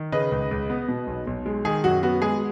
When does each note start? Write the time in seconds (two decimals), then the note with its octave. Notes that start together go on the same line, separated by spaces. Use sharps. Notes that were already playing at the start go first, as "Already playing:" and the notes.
Already playing: D#3
0.12 C#3 B4 D#5
0.31 C#2
0.51 C#2
0.70 B3
0.88 B2
1.07 B1
1.27 B1
1.46 G#3
1.65 D#3 G#4
1.84 F#2 F#4
2.03 B3 F#4
2.22 G#3 G#4